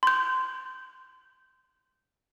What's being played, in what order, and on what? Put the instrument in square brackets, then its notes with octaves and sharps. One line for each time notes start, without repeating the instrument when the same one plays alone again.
[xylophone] C6 G6